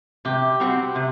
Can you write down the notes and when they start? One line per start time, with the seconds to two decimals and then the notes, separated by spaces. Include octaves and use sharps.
0.25 C3 G4
0.60 G3 C4 F#4
0.95 C3